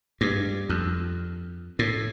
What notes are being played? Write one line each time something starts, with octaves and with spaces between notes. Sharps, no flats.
G2
F2
A2